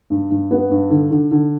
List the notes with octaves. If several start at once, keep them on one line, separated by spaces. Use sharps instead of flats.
G2
G2
B3
G2
D3
D3
D3